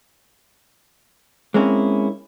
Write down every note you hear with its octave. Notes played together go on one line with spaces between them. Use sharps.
G#3 A#3 C4 C#4 E4